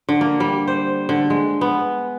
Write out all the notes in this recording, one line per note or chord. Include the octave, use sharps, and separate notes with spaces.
D3
A#3
G3
C5
D3
G#3
B3